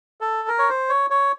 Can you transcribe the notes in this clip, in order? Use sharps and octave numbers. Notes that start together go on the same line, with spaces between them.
A4
A#4
C#5
C5
C#5
C#5